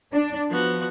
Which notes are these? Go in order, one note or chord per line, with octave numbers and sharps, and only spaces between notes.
D4
F3 B3 F#4